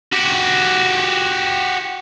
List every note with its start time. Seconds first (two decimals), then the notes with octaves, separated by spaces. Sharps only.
0.13 F#4 G4